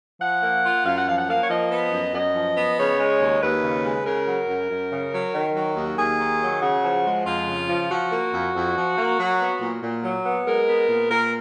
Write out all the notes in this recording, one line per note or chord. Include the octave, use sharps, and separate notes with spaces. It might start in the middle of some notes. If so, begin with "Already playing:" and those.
F3 F#5
A#3
F4
F#2 F5
F#5
F3 F5
F#5
A#3 F5
C#5
F3 D#5
B3
F#2
F#2 D#5
F3
B3
C#3 C#5
G#3
D#2
D#2 B4
C#3
G#3
C#3 A#4
F#3
F#2
F#2
C#3
F#3
D#3
F#3
D#2
D#2 G#4
D#3
F#3
C#3 F#4
F3
G#3
F2 F4
C#3
F3
F3 F#4
A#3
F2
F2
F3
A#3
F#3
B3
A#2
A#2
F#3
B3
G#3 A#4
B3
A#2
A#2 A#4